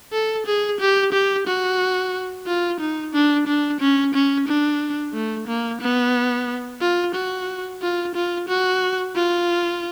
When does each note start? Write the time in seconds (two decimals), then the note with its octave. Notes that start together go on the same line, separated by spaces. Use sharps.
0.13 A4
0.46 G#4
0.81 G4
1.13 G4
1.47 F#4
2.47 F4
2.80 D#4
3.13 D4
3.47 D4
3.81 C#4
4.14 C#4
4.48 D4
5.14 A3
5.48 A#3
5.81 B3
6.81 F4
7.15 F#4
7.82 F4
8.15 F4
8.49 F#4
9.16 F4